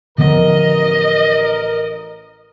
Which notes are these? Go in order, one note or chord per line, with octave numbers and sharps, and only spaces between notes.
A1 D3 F3 B3 A#4 D#5